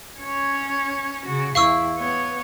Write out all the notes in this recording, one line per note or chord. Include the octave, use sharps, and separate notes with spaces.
C#4 C#5
C#3 F#4
E2 E4 F5 C#6 E6
B3 C#5